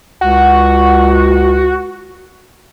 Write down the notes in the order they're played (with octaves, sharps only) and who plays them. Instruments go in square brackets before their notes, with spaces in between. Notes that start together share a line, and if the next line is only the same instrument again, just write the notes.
[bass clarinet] C#2 [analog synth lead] F#4